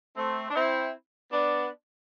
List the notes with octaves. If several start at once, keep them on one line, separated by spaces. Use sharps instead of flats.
A3 C4
D4
C4 E4
B3 D4